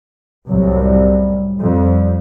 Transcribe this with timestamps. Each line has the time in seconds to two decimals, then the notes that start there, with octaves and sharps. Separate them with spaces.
0.48 C2 F#2 A2 F#3
0.81 G3
1.61 F2